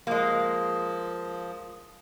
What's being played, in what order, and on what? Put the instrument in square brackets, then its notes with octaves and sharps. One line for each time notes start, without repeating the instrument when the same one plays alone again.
[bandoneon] F3 [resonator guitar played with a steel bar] G#3 A#3